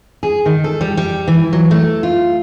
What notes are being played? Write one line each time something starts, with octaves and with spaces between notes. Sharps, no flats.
G#4
D#3
A4
G3
G3
E3
F#3
A3
F4